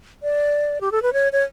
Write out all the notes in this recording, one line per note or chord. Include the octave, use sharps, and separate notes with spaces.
D5
G4
A4
B4
C#5
C#5